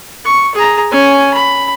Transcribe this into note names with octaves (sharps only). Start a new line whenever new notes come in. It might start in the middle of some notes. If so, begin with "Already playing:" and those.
C#6
G#4 A#5
C#4 G#5
B5